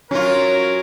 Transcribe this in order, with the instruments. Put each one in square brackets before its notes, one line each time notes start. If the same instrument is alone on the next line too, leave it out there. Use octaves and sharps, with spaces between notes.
[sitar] F#3 F4 [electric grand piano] C#4 [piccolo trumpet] A#4 [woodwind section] C#5